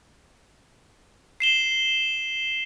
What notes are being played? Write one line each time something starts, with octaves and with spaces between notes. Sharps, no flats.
C7 E7 G7